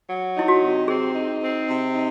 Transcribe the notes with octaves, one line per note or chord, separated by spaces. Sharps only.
F#3
D#4 E4
F#4
C3
C4 G#4
D#4
C4
C3
D#4